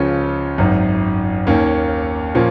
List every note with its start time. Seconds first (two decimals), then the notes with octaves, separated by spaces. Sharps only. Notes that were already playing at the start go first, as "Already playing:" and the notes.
Already playing: C#2 C#3 F3 C#4 F4
0.58 G#1 F#2 D#3
1.47 D#2 D#3 A#3 C#4
2.35 A#2 F3 A#3 C#4